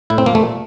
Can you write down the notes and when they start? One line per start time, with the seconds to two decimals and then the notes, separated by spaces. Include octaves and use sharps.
0.10 A2 E4
0.18 C4
0.26 F3 A#3
0.35 A3
0.43 A#2